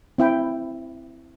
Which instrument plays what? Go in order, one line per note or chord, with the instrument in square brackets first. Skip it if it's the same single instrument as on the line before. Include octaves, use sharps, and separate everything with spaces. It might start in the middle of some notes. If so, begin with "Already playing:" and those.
[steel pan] C4 E4 G5 B5